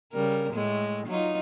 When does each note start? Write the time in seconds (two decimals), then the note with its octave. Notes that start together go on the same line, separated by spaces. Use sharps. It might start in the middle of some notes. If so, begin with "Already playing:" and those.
0.12 C#3 G3 A#4
0.53 A2 G#3 A3
1.06 F#3 D#4 F4